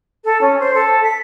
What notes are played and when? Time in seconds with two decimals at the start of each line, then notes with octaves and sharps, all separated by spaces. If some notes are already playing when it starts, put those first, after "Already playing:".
0.25 A4
0.41 C#4
0.59 C5
0.74 A4
1.04 B6